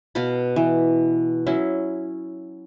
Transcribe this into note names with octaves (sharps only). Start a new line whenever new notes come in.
B2 F5 A5 B5
E3
F#3 C#4 E4